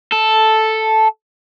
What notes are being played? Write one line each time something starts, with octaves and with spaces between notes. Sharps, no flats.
A4